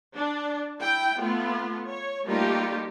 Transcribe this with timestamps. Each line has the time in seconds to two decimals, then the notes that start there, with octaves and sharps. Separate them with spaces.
0.16 D4
0.80 E4 G5
1.19 A3 B3 F4
1.87 C#5
2.26 G3 A3 A#3 D#4 F4 G4